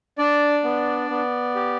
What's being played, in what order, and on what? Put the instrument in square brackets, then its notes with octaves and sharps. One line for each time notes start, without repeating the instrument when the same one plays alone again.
[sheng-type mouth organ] D4 D5
B3
B3
G4